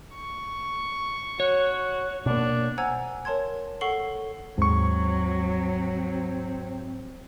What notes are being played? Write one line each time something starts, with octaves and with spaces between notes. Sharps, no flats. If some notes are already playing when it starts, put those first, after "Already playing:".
C#6
F#4 C#5
B2 A#3 D4
C5 F#5 G#5 A#5 E6 G#6
A#4 C#5 A5 C6 G#6
A4 F#5 C#6 C7 F#7 G7
D#2 G#2 F#3 C4 C#6